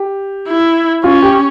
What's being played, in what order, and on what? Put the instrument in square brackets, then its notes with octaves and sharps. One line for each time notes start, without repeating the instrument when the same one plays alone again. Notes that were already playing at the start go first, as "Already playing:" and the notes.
Already playing: [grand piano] G4
[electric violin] E4
[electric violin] C#4 [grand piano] F4
[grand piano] G4